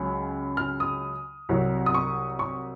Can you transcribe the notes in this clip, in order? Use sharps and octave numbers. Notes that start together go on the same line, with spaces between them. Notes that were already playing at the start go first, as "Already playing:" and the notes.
Already playing: C#2 C#3 F#3
F6
D#6
C2 C3 F#3
D#6
C#6
C#6